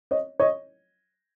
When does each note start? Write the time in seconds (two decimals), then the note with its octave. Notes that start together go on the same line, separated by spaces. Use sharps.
0.11 C#5 D#5
0.39 C#5 D#5